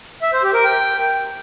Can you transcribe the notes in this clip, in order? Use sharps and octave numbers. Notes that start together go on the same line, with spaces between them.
E5
C5
G4
A#4
G5